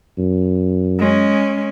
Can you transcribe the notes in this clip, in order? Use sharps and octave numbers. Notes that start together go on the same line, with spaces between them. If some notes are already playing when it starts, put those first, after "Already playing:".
F#2
G#3 C#4